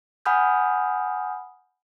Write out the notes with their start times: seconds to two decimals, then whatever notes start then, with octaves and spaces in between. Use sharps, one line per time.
0.26 F#5 G#5 B5 D#6 F6 G6